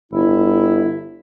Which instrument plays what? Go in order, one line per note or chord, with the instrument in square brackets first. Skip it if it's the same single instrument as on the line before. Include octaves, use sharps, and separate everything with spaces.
[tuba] G1 [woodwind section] E4